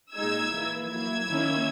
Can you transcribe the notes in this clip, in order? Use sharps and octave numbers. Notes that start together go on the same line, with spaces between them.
A#2 G#3 D#4 E6 G#6
E3 A#3 E4
F#3 A#3 E4 E6 G#6
D#3 A#3 C#4 E4